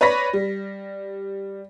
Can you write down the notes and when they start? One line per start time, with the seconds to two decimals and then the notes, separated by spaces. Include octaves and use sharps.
0.01 B4 C#5 D5 B5 A#6 B6
0.33 G3